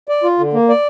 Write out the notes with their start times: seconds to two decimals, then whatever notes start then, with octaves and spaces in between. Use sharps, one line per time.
0.09 D5
0.23 F4
0.39 D3
0.54 A#3
0.69 D5